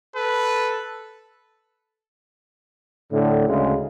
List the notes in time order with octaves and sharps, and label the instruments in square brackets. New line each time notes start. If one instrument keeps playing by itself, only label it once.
[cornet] A4 [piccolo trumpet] B4
[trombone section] A2 D3
D2 C#3 G#3